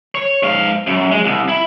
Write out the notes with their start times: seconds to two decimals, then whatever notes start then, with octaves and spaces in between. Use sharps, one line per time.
0.15 C#5
0.43 G#2 F5
0.87 F#2
1.12 G#3
1.24 C2
1.49 E4